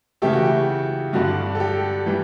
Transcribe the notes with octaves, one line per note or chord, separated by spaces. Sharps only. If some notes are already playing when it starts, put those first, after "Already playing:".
C#3 E3 A3 G4
F#4
G4
G2 D3 G3 D4 F#4
A4
G4
E3 G3